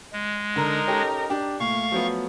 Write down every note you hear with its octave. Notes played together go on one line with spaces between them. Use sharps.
G#3
D3 D#4 A#4 A#5
C#4 G4 A4
D4 G4
A#2 A3 F5 C#6
F3 F#3 B3